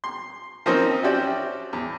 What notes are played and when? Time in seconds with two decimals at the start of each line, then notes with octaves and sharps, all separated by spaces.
0.04 C6
0.66 F3 A#3 C4 C#4 D#4 C5
1.03 C#4 E4 F#4 G4 C5 D5
1.73 E2